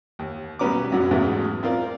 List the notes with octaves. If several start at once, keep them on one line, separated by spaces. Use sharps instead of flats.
D#2
B1 G3 B3 C#4 A#5 D6
B1 F#2 A#2 F#3
E2 G#2 C#3 F#3 G#3 A3
C4 F4 A#4 D5